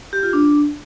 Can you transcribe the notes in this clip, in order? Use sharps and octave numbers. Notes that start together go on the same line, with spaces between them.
G4
F4
D4